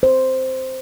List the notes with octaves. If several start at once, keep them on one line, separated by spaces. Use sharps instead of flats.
C5